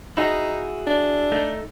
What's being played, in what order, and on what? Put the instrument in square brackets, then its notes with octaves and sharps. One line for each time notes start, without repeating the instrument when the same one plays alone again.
[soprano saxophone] D#4 [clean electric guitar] E4 F#4 G#4
[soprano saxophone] D4
[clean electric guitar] A3 D#4